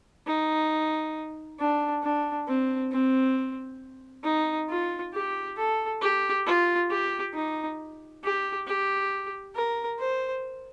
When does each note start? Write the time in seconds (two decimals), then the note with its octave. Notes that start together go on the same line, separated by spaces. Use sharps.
0.27 D#4
1.60 D4
2.03 D4
2.48 C4
2.92 C4
4.24 D#4
4.70 F4
5.14 G4
5.57 A4
6.02 G4
6.47 F4
6.90 G4
7.35 D#4
8.24 G4
8.67 G4
9.56 A#4
10.00 C5